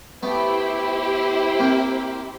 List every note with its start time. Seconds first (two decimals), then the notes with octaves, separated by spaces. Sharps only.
0.23 A3 B3 E4 G4 C5
1.59 A#3 C4